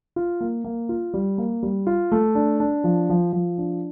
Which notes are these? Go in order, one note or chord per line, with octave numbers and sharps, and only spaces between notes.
F4
A#3
A#3
F4
G3
A#3
G3
F4
A3
D4
D4
F3
F3
F3
D4